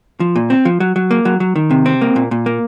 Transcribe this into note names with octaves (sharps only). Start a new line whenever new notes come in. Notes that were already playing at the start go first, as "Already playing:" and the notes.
F3
A#2
C4
F3
F#3
F#3
A#3
F#3
F#3
D#3
C3
C4
A#3
A#2
A#2
A#3